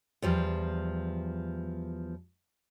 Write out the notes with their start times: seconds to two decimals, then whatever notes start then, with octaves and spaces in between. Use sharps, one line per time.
0.22 E2 F3 G3